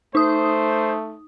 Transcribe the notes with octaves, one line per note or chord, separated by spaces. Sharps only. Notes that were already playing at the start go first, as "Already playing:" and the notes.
A3 D#4 C5 D#6